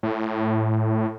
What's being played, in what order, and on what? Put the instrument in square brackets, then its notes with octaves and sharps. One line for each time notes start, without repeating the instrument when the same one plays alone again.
[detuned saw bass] A2